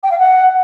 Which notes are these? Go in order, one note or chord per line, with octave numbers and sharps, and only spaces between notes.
G5
F5
F#5